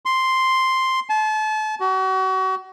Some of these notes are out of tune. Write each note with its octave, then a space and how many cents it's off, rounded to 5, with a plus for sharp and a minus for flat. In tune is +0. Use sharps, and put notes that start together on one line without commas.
C6 +0
A5 -35
F#4 +35